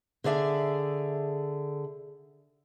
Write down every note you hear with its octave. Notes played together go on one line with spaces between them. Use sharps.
D3 G#4 D5 E5